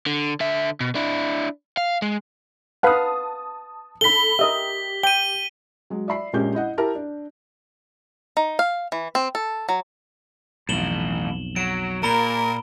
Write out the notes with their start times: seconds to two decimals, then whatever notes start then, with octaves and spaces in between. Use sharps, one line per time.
0.06 D3
0.40 D3 E5
0.80 B2
0.95 D4 E4
1.77 F5
2.02 G#3
2.83 B4 F5 F#5 A5 D#6
4.01 A4 B5 B6 G7
4.39 G4 A#4 D#5 E5
5.03 G5 D#7 G7
5.90 F#3 G#3
6.08 D5 E5 B5 C7
6.33 A#1 A#2 G#3 C#4 G4 G6
6.55 E4 D#5 F#5
6.78 E4 G4 A#4 E5 A5 A#5
6.95 D4
8.37 D#4
8.59 F5
8.92 E3
9.15 C4
9.35 A4
9.69 F#3
10.69 B1 F2 A2 E3 E7 F#7 G7
11.56 F#3 D7
12.03 A#2 A#4 A#5 B5 G7